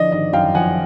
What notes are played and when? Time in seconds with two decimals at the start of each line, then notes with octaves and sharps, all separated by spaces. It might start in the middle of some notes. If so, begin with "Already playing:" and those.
Already playing: D3 F3 D5 D#5
0.12 G#1 D#5
0.33 F#2 F5 G5
0.55 F3 F#5 G#5